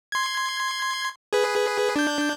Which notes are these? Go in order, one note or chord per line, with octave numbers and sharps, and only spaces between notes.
C6 G#6
G#4 B4
D4 G6